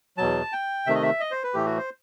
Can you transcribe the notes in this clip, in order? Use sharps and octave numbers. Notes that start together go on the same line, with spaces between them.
E2 B2 F#3 A5
G5
C3 D#3 A3 E5
D#5
E5
D#5
C5
B4
A2 E3 A3 G4
F#4
C5